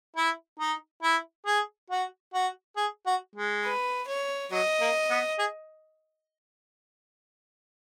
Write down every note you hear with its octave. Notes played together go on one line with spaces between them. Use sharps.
E4
D#4
E4
G#4
F#4
F#4
G#4
F#4
G#3
B4
C#5
F#3 D#5
A#3
B3
G#4